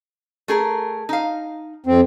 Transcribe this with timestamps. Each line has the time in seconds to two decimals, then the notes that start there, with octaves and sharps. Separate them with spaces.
0.48 A3 G#4 A#4
1.09 D#4 F5
1.86 F2 C4